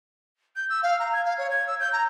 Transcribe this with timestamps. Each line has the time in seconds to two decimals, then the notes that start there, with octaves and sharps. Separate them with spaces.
0.56 G6
0.69 E6
0.82 F5
0.99 A#5
1.13 G#6
1.25 F5
1.38 C#5
1.50 G#6
1.67 E6
1.80 G6
1.92 A#5